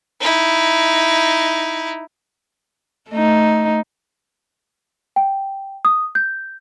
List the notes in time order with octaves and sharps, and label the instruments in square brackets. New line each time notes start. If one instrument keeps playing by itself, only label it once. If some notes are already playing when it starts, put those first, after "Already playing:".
[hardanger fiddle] D#4 E4
[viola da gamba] A3 D#4
[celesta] G5
D#6
G6